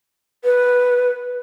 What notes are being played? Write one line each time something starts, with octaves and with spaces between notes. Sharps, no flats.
B4